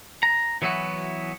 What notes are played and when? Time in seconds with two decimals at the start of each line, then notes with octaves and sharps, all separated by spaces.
0.23 A#5
0.62 E3 F#3 B3 E4 F#4